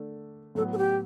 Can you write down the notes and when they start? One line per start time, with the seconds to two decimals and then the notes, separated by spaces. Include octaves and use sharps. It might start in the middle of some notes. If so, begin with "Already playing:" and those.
Already playing: D3 A3 D4 A4
0.55 A2 F#3 B3 A4
0.73 A4
0.78 G4